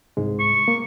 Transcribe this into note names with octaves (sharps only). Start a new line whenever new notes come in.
C2 G#2 G#3
C#6
A#3